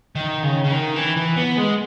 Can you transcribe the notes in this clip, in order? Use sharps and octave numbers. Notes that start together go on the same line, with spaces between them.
D#3
C#3
C#3
D#3
E3
E3
B3
G#3